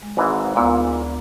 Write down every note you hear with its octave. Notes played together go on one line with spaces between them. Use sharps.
G#3
G#1 G#2 E3
D2 A#2 B3 E6